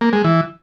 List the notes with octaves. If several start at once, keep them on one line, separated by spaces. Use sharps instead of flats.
A#3
G#3
E3